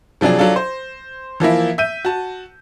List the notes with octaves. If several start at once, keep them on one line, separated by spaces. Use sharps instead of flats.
C3 F3 F#3 D4 G#4
F#3 D4 F4 A4
C5
E3 F3 A#3 E4
E5 G6 D#7
F#4 A5